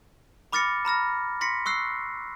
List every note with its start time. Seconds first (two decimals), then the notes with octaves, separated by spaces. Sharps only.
0.53 B5 D6 F6 A6 A#6 C#7
0.85 A#5 B5 F6 A#6
1.41 C6 A#6 B6 C#7
1.66 C#6 E6 F#6 C7